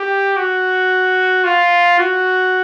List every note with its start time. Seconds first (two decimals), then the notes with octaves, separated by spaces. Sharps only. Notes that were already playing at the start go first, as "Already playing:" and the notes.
Already playing: G4
0.37 F#4
1.45 F4
1.99 F#4